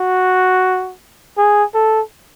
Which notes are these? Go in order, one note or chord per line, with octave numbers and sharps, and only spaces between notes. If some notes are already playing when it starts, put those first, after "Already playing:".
Already playing: F#4
G#4
A4